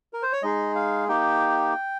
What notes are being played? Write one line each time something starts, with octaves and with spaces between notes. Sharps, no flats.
A#4
C5
C#5
G#3 D#4 G#4 D#5
F5
A#3 D#4 G4 G5